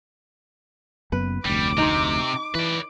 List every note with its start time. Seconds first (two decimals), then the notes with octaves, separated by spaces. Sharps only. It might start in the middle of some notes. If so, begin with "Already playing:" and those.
1.12 F#1 F#2 B3 B4
1.45 F1 D2 G3 D6
1.78 C3 D#4 C5
2.55 E3 B4 D5